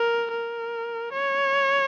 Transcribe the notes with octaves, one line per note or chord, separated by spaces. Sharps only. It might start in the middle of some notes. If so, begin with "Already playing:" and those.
Already playing: A#4
A#4
C#5